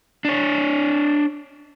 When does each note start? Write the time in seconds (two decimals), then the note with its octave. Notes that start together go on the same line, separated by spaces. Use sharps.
0.25 D4 C#5